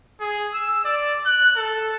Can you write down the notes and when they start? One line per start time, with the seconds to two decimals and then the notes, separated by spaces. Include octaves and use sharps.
0.20 G#4
0.54 E6
0.85 D5
1.26 F#6
1.56 A4